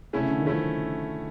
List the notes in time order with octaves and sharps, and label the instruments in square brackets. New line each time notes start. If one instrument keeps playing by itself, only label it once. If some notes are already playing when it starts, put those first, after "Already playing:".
[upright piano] C3 [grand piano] A3 C#4 E4
[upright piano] C#3
D3
D#3
[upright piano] F3 [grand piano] A3 C#4 E4